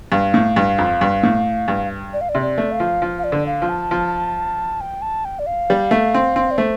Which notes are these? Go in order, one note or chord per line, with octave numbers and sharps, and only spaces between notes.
G2 F5
A2
G2
F2
G2
A2
G2
D5
F5
D5
C3
D5
A3
F5
F3
F3
F5
D5
D3
F5
F3
A5
F3
G5
A5
G5
D5
F5
G3
A3
C4
C4
D5
A3 C5